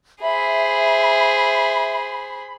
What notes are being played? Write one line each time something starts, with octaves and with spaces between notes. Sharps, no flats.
G#4 C5 E5 B5